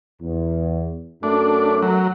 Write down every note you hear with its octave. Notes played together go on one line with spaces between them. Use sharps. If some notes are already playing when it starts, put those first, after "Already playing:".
E2
F#2 A3 D4
F#3